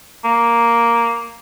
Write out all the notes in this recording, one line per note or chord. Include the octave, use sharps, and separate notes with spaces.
A#3